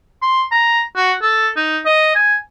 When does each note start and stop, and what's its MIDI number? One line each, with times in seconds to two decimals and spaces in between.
0.22 0.44 84
0.51 0.81 82
0.96 1.13 66
1.22 1.48 69
1.56 1.79 63
1.85 2.13 75
2.15 2.36 80